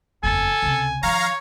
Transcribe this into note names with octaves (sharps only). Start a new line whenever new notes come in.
F#1 E2 A4 G#5
C#2 C3
D#3 F3 C#5 F5 A#5